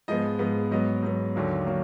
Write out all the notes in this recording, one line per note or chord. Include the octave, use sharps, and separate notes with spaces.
G#2 F3 G#3 B3 D#5
G#2 F3 G#3 B3
G#2 F#3 B3 D#5
G#2 F#3 B3
D#2 D3 F#3 A#3
D3 F#3 A#3